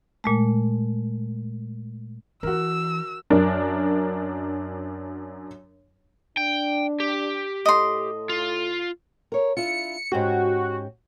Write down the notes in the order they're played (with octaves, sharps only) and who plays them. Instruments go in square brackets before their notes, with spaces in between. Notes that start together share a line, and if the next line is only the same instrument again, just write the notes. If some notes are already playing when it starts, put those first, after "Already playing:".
[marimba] A#2 G#3 A3
[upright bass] E3 [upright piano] F#4 A#4 [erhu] E6
[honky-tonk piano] F#2 D4 A#4
[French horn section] D4 [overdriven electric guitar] G5
[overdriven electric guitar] G4
[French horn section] A2 A4 [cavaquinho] D#5 C6
[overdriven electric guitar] F4
[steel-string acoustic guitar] A#4 C#5
[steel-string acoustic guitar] D4 E4 F4 [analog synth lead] C#7
[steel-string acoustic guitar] G#2 C#4 G4 [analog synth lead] F#4